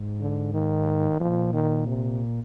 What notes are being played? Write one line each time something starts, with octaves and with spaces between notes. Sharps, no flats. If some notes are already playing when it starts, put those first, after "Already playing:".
Already playing: G#2
D3
D#3
A#2 F3
D#3
C3